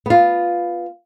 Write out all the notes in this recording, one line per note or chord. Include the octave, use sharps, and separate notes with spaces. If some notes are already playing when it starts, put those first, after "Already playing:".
B3 F4